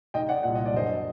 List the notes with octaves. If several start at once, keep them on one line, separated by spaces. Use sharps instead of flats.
D#2 D#3 D#5 G5
D5 F#5
C2 A#2 F#5
D#5
D5
F#2 D3 C5 D#5